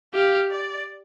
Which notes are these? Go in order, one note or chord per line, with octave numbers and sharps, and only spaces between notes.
G4 F5
D5